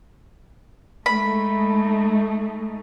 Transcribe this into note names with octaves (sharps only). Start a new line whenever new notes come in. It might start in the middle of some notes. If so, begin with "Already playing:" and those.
G#3 A3 D#4 B5